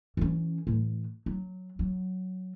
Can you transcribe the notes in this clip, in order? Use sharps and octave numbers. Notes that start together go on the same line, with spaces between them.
E3 C#4
A2 E3
F#3
F#3